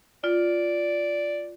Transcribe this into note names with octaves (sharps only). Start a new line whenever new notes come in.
F4 D5